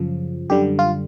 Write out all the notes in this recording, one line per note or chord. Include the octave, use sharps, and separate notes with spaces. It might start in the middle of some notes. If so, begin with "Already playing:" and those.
Already playing: F#2 C#3 F3
F#2 D3 G3 G4
F4